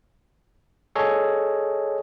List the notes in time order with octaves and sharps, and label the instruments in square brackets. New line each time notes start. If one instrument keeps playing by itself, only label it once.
[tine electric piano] G#4 A4 C#5 D#5